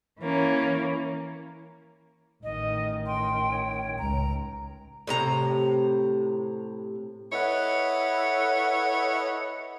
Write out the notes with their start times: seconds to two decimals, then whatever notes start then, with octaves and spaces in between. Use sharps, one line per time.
0.19 E3 A#3 C#4
2.43 A1 D#3 D#5
3.06 G5 C6
3.51 C#5
3.98 C#2 A#5
5.07 A2 C3 A#5
7.33 E4 A4 B4 C#5 D#5 F#5